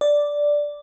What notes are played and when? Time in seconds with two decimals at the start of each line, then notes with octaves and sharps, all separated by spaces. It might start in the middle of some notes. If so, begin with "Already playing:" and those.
0.01 D5